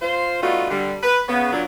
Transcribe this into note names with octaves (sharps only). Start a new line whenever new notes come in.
F4 C5
G3 A3 B3 D#4 F4 F#4
D3 G3
B4
C#3 B3
A#2 F#3 D4